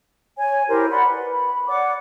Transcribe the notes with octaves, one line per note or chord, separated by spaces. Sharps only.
C#5 G#5
E4 G4 A#4 C5
D5 F#5 B5 C6
B4
B5
C#5 D5 F#5 D6